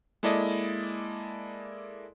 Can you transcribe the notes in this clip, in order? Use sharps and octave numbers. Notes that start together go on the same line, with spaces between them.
G#3 A#3 E4 A4 D5 D#5